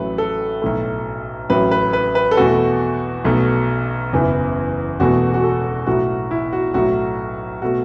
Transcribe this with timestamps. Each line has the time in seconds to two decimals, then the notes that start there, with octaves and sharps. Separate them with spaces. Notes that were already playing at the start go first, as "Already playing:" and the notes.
Already playing: A1 A2 F#3 A3 B4
0.18 A4
0.62 B1 A2 A3
1.50 A1 A2 F#3 B4
1.71 B4
1.93 B4
2.15 B4
2.31 A4
2.37 E2 B2 A3 F#4
3.25 B1 B2 A3
4.12 F#1 E2 E3
5.00 E1 E2 B2 A3 F#4
5.34 F#4
5.44 A4
5.87 B1 A2 A3 F#4
6.31 E4
6.53 F#4
6.74 B1 A2 F#3 A3 F#4
7.62 B2 A3 F#4